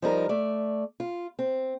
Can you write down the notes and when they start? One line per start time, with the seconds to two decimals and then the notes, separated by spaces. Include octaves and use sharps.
0.02 F3 G3 D#4 A#4
0.29 A3 D5
1.00 F4
1.39 C4